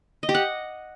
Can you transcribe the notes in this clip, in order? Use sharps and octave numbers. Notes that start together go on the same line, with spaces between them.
D#5
G4
F#5